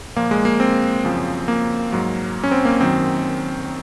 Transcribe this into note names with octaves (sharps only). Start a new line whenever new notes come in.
A#2 F3 A#3
G#3
A#3
C4
F#2 C#3 F3
A#3
G#2 F#3
C#4
C4
A#3
F#2 D#3 F#3 C4